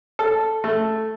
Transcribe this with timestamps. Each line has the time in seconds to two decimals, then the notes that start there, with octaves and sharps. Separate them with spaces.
0.19 A4
0.64 A3